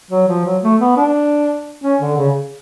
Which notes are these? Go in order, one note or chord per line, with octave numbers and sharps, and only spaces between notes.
F#3
F3
F#3
A3
B3
D4
C#4
D3
C#3